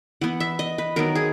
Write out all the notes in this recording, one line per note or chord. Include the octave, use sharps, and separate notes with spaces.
E3 B3 F#5
E5
D#5
B4
D#3 F#3 B3 A#4
G#4